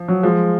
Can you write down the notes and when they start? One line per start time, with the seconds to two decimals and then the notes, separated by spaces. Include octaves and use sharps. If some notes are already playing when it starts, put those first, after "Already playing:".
Already playing: F3
0.08 F#3
0.23 F3 G#3